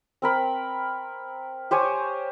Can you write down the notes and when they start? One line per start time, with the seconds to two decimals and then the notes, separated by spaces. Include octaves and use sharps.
0.22 C4 A#4 B5
1.71 G4 C5 C#5 G#5